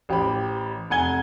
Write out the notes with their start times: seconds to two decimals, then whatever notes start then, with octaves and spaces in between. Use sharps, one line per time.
0.09 A1 G4 C5 B5
0.90 F1 F#5 G#5 G#6 G7